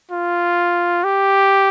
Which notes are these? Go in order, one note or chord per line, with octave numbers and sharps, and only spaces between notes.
F4
G4